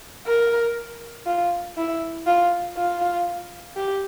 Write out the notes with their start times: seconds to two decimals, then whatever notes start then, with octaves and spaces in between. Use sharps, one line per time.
0.27 A#4
1.26 F4
1.77 E4
2.27 F4
2.77 F4
3.76 G4